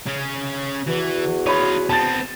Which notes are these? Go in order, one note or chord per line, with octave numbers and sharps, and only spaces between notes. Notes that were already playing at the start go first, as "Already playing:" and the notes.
C#3 C#4
E2 E3 F#4
D#4 F4 C#5 B5
B3 C4 A5 A6